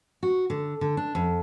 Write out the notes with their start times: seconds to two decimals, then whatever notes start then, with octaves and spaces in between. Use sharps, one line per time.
0.23 F#4
0.50 D3
0.81 D3
0.97 D4
1.15 F2